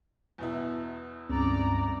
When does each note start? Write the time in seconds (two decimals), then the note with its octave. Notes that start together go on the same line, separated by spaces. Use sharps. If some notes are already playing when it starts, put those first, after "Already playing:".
0.38 E2 B2 E4
1.29 C#2 G2 C4 C#4 D5 A#5